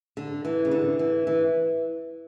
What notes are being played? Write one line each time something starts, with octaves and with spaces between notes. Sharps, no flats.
D3
E3
C#3
D3
E3
E3